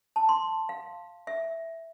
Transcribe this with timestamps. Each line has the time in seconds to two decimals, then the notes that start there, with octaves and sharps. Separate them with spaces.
0.16 A5
0.29 C6
0.69 F5
1.27 E5